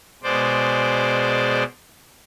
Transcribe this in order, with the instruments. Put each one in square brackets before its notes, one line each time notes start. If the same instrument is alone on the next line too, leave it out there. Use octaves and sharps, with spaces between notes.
[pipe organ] B2 G#3 C5 D5